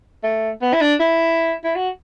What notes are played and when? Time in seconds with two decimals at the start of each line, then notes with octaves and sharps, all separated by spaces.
0.24 A3
0.62 B3
0.73 E4
0.81 D4
1.00 E4
1.64 E4
1.76 F#4